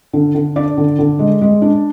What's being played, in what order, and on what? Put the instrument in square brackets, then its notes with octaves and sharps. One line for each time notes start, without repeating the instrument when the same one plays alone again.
[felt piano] D3
D3
D4 D5
D3
D3
G#3
G#3
D4